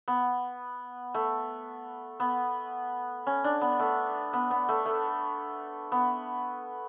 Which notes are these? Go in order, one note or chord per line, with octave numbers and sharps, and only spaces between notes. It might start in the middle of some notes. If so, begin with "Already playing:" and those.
B3
A3
B3
C#4
D4
B3
A3
B3
B3
A3
A3
B3